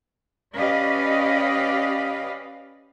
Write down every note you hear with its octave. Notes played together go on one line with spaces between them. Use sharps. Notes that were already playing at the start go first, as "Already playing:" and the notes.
C#4 G4 B4 D5 D#5 F5